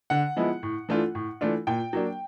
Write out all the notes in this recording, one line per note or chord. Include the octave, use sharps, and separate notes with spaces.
D3 F#5
F3 G#3 B3 E4
A2
E3 A3 D4 F4
A2
E3 A3 D4 F4
A#2 G5
F#3 A#3 D4